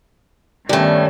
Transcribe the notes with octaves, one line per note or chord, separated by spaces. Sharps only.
G2 D#3 G3 A3 B3 C#4 C#5